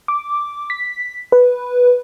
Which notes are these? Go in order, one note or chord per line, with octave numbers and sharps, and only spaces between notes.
D6
B6
B4